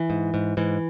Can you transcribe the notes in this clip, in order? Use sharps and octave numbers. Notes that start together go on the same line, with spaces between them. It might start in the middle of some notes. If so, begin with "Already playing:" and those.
Already playing: E3
G#2
G#2
G#2 E3